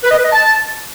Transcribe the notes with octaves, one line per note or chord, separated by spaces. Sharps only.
B4
D#5
B4
D#5
A5